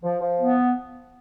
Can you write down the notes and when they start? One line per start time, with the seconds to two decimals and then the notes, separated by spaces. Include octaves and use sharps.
0.04 F3
0.21 F3
0.40 B3